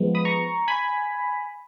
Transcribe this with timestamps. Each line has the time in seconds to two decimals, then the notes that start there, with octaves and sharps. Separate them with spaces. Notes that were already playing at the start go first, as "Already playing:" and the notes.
Already playing: F3 G#3 B3
0.15 B5 D#6
0.25 A#5 C#6
0.68 G#5 B5